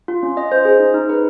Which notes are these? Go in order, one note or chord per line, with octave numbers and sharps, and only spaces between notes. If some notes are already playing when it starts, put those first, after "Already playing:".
F4
C#4
D#5
C5
G#4
D#4
D#4
B4